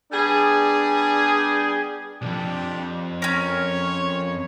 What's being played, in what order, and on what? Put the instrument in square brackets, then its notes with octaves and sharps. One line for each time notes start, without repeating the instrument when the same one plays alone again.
[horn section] G3 B3 D4 G#4
[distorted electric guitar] B1 F2 [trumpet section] D4 G4
[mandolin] C#4 A#4 [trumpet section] C#5